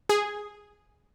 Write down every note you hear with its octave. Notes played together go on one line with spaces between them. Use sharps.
G#4